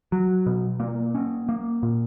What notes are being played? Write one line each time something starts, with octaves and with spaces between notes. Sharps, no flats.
F#3
B2
A#3
C#4
A#3
A#2